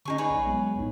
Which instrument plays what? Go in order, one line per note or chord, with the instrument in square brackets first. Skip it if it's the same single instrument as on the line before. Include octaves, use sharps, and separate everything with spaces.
[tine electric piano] D3 C#4 [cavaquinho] D#4 G#4 C#6
[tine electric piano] D#4 D5 [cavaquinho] G#4 B4 C#5
[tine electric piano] A#1
F#3 G#3 B3
C2 A2 D#4